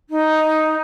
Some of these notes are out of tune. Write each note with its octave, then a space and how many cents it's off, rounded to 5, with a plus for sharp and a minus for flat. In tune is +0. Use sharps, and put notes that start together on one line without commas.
D#4 +5